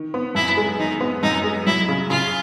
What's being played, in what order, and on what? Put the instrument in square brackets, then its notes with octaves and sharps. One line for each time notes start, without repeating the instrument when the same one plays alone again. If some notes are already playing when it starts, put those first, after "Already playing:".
Already playing: [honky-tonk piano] D#3
B3
[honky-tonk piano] F#2 [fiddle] E4
[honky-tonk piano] G#3
[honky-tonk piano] D#3 [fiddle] D#4
[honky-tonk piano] B3
[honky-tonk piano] F#2 [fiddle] D#4
[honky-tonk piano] G#3
[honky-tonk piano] F#3 [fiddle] E4
[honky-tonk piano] C#3
[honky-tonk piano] C#3 [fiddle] F4